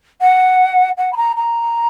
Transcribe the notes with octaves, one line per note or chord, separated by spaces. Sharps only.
F#5
F#5
B5
A#5
A#5